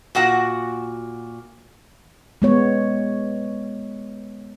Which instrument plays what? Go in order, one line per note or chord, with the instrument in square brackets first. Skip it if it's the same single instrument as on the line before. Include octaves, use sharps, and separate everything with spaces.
[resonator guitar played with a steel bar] A#2 F#4 F#5
[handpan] G#3 B3 C#5